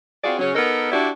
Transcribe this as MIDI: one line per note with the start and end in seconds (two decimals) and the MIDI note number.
0.24 0.38 60
0.24 0.38 65
0.24 0.38 66
0.24 0.38 68
0.24 0.38 74
0.39 0.50 49
0.39 0.50 54
0.39 0.50 61
0.55 0.91 59
0.55 0.91 63
0.55 0.91 69
0.55 0.91 70
0.92 1.09 62
0.92 1.09 64
0.92 1.09 66
0.92 1.09 67
0.92 1.09 74